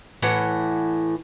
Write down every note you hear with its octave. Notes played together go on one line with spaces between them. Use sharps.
A2 E3 F#5